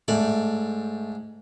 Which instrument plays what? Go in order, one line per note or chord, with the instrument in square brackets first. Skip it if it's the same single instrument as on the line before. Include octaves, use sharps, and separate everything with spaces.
[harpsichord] G#2 D5 [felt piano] A3